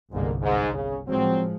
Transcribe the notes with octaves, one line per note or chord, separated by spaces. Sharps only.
G1 C2 G#2 D3 A#3
G#2
C#3
A2 F3 F#3 G#3 C4